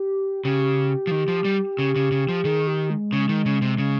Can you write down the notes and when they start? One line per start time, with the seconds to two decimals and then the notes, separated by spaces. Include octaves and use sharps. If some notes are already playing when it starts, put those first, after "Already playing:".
Already playing: G4
0.45 C#3 G4
1.07 F3
1.11 D#3
1.28 F3
1.45 G3
1.79 C#3
1.96 C#3
2.12 C#3
2.29 F3
2.45 D#3 G#4
2.67 G4
2.90 G#3
3.13 C#3
3.29 D#3
3.46 C#3
3.62 C3
3.78 C#3